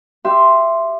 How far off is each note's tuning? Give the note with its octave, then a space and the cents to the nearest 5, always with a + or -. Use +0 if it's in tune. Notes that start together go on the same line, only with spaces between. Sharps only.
G4 +0 E5 +15 C6 +0